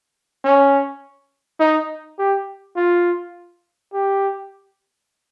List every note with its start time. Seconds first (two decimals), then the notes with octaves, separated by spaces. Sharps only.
0.45 C#4
1.60 D#4
2.19 G4
2.76 F4
3.93 G4